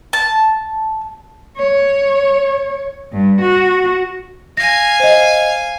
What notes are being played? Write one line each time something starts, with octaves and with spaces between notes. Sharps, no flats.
A5
C#5
G2
F#4
F5 G#5 A#6
C5 D#5